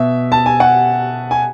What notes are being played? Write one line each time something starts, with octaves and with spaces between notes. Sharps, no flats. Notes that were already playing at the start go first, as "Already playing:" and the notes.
Already playing: B2 E5
A5
G#5
F#5
G#5